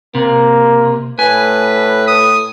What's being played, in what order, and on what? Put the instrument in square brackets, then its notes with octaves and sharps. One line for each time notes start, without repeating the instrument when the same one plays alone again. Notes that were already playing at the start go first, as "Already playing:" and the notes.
[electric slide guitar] C3 [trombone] A#3
[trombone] A2 [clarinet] B4 [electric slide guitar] G#5
[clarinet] D#6